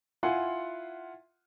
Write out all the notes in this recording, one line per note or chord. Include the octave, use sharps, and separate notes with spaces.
E4 F4 F#5 G#5 C6